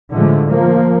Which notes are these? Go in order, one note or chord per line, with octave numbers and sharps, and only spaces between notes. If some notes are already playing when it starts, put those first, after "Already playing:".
A2 D3 F3 G#3 A3
F3 A#3